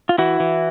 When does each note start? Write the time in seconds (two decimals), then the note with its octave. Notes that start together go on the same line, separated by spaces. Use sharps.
0.09 F4
0.18 E3 E4 F#4
0.40 E3